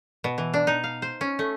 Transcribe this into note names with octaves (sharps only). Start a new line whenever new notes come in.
B2
E3
D4
D#4
F5
C5
C#4
A3